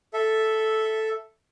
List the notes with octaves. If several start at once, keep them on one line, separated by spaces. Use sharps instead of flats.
A4 E5